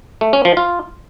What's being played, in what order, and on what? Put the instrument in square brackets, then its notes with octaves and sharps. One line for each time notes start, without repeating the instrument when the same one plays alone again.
[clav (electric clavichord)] A3
C#4
F3
F4